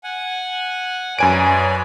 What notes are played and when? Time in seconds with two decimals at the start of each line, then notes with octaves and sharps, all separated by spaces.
0.04 F#5 G#5
1.19 F#2 B4 C#5 D5 G#5 D7